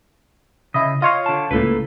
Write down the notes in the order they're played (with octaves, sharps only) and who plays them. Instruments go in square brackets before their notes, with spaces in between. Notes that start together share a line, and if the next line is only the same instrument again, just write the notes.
[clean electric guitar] C#3 [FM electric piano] E4 D#5
[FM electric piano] F4 C#5 F5 [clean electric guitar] D#5
[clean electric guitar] D3 A5
[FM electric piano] C#2 A2 [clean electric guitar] A#3 A4 B4